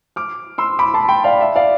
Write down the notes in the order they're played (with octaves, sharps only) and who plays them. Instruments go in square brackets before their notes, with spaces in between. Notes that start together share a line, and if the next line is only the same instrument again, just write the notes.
[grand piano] D6 F6
C6 E6
B5 D6
A5 C6
G5 B5
D5 F5
E5
D5 F5